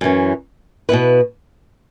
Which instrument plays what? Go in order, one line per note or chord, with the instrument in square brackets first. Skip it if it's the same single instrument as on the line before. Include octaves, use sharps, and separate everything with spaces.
[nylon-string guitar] F#2 E3 C#4
B2 B3 E4 B4